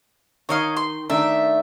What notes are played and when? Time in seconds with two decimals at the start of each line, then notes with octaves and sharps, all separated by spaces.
0.49 D#3 C#5 D#5 F5
0.76 C6
1.10 D#3 A3 D4 E5